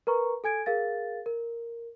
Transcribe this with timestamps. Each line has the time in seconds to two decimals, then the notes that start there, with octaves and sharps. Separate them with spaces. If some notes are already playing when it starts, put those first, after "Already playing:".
0.07 A#4 B4 A#5 C#6
0.44 A4 G#5 G#6 D7
0.66 G#4 A#4 F5 A6
1.26 A#4